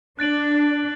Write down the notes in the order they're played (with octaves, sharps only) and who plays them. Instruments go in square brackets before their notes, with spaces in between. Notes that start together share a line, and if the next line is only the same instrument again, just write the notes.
[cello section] D4 [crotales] F#6 A6 D7 F#7